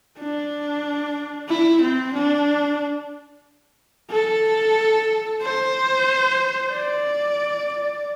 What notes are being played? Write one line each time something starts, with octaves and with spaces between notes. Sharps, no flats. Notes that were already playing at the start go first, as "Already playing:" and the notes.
D4
E4
C4
D4
A4
C5
D5